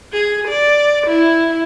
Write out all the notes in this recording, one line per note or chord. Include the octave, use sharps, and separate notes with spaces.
G#4
D5
E4